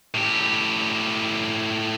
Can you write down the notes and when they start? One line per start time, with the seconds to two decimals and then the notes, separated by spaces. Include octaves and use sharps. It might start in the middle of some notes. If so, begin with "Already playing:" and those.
0.14 A2 G4